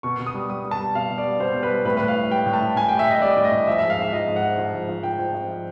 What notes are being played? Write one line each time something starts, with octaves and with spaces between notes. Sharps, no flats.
B2 C#6
B2
D#6
G3
G3 D#6
G3
A5
G3
B2 F5
B2
D5
G3
B2 C5
G3
B4
G3
A2 B4
A2 B4
F5
A2
G3 G5
A2
A5
A2
A2 G#5
G3 G5
E5
A2 D#5
G3 D5
A2
D#5
A2
F3 E5
G#2 E5
F5
G#2 E5
F3 D#5
G#2
F#5
F3
F3
G#2
F3
F3 G5
F3
F3